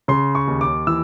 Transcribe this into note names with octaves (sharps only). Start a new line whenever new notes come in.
C#3 C6
C#6
D#2
D6
E3 E6